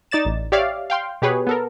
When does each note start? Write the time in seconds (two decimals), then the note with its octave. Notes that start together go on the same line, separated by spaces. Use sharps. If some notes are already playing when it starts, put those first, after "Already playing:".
0.11 D#4 D5 A6 E7
0.25 A1
0.52 G4 C#5 D5 E5 F5
0.90 F5 G5 C6
1.22 B2 G4 G#4 B4 C#5
1.47 B3 A4 A#4